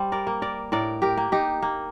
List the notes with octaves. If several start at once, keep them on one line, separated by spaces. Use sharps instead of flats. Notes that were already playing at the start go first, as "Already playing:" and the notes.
Already playing: G3 C5
A#4 D5
A#3
A#4 D5
A2 A#4 D5
G4 A#4
A#3
D#4 G4
A#3